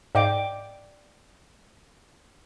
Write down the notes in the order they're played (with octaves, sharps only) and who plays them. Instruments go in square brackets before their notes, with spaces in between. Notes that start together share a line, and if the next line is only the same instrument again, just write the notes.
[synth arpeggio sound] G#2 D#5 F5 [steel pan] D5 G5 D6